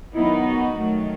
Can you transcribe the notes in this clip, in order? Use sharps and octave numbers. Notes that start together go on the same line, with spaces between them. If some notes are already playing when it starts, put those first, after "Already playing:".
D#3 F#3 B3 D#4 E4
F#4
D#3 F#3 A3